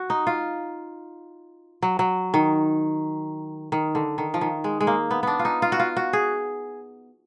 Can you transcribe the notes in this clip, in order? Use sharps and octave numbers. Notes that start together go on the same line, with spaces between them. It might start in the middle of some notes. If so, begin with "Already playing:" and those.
Already playing: F#4
D#4
F4
F#3
F#3
D#3
D#3
D3
D#3
F3
D#3
G#3
G#3
A#3
B3
B3 D4
F4
D#4
F4
F#4
F4
F#4
G#4